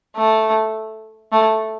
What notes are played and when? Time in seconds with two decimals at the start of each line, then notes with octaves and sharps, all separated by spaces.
0.16 A3
1.32 A3